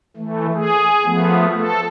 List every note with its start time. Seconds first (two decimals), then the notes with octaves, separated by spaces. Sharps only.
0.17 E3 A3
0.55 G#4
1.05 F3 A3 B3
1.57 A4